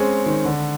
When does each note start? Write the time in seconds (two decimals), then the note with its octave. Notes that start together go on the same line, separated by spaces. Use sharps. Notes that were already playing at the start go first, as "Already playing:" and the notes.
Already playing: G#3 C4 C#4
0.26 D#3
0.45 D3